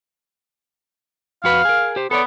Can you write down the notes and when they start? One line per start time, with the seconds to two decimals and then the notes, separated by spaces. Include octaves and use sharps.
1.44 F2 F#4 B4 F5
1.65 G#4 A#4
1.96 G4 C5
2.11 B3 A4 C#5 D5